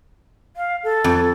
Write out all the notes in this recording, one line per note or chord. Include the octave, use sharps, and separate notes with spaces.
F5
A4
F2